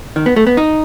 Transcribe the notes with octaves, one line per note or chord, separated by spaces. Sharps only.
D#3
B3
A3
B3
D#4